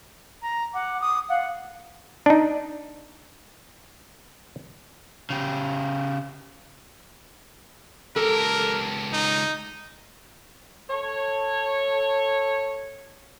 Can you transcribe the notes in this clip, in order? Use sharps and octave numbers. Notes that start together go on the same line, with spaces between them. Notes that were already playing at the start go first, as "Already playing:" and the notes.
A#5
F#5 D6
D#6
F5 F#5
D4 D#4
C#3 G4
C#2 G4 A4 A#4
D#4
A4 C#5